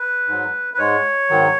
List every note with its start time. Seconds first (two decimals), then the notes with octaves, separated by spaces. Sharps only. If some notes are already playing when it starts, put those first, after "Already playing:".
Already playing: B4
0.28 G#2 F#3
0.74 B4
0.78 G#2 G#3 C#5
1.29 G#2 D#3 F#3